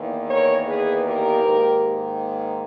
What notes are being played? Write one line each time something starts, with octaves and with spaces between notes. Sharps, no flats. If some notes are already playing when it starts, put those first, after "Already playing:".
Already playing: E2 D#3 A#3
A#4 C#5
G#4 B4
G4 A#4
G#2 D#3 A#3